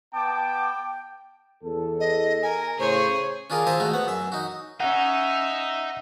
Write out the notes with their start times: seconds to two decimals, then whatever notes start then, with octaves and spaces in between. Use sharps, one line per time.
0.14 B3 G5 A5 D6
1.63 E2 A4
2.00 D#5
2.43 A#4 G#5
2.79 A2 C#3 G#4 C5 C#5
3.50 C#4 D4 F4 G#4 A#4
3.67 F4 C5 E5 G#5 A#5
3.80 G#3 A3 C#4 F#4
3.93 B3 F#5
4.07 F#2 E5
4.32 D#4 F#4
4.80 C#4 D#4 E5 F#5